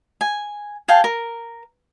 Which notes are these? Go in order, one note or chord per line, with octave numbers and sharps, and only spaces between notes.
G#5
G#4 F5 G5 A5
A#4